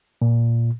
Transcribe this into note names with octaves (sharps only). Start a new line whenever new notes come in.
A#2